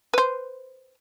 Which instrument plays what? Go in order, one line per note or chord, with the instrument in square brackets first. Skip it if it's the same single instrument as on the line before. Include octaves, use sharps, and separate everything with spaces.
[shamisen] B4 C5